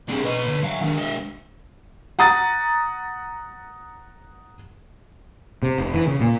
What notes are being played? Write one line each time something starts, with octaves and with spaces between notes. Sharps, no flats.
C2 C4 D4 G#4
B2 B4 C#5 D#5
D3
F#3 E5 F5
D#3 G#3 D4
D#5 E5
F#5 A#5 D#6 A6
C3
F1
E3
C#3
A#2